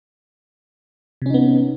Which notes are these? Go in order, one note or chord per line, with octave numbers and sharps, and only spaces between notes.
C3 B3 C#4 D#4